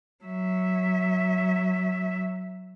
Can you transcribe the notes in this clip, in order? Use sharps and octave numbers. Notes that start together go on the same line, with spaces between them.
F#3 E5